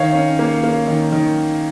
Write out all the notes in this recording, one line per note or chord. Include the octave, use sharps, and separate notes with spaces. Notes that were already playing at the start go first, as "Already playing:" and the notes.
Already playing: D#3 C#5 F5
C#4
A#3
A#3
D#3
D#3